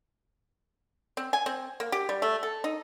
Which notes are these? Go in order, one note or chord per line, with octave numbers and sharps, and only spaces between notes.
C4
G#5
C4
A#3
G4
G3
A3
A4
D#4